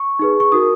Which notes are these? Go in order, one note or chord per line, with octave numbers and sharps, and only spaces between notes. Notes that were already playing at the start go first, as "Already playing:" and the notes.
Already playing: C#6
D#4 G#4 B4
C#6
D#4 F#4 A#4 D#6